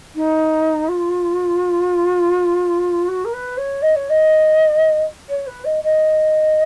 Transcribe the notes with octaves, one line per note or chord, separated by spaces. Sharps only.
D#4
F4
F#4
A#4
B4
C#5
D#5
C#5
D#5
C#5
B4
D#5
D#5